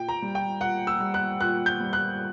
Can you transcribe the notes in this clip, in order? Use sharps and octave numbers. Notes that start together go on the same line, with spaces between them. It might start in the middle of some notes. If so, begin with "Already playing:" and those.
Already playing: A#2 G5
A#5
G3
G5
A#2 F#5
E6
G3
F#6
A#2 F#6
G6
G3
F#6